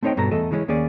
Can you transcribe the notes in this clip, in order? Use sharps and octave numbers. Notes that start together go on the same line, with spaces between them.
A3 C4 D#4 C#5 D#5 G5
G2 B2 A4 A#5
E2 A3 A4 D#5
C#3 E3 G#3 C4 C#4
D#2 A#3 C#4 G#4 D5